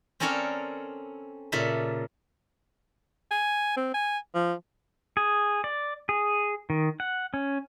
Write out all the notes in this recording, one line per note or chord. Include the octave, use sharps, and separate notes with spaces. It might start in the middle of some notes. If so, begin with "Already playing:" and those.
C4 C#4 A4 A#4 C#5 D5
A#2 C#3 A4 E5
G#5
C4
G#5
F3
G#4
D5
G#4
D#3
F#5
C#4